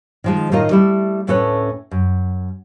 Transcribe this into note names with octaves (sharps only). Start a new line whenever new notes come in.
D#3 F3 G#3
A2 D#3 D#4 F4 A#4 D#5
G3 A3 E4
D2 A2 C#4 A4 B4 C#5
F#2